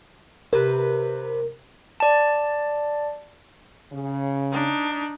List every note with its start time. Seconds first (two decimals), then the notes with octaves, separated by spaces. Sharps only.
0.53 C3 A#4 B4
2.00 D5 A5
3.92 C#3
4.52 D4 D#4